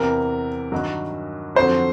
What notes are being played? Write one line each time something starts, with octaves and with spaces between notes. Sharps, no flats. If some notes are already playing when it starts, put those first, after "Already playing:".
Already playing: E2 C3 E3 A#4
G2 D#3 F#3
F2 D3 F#3 C5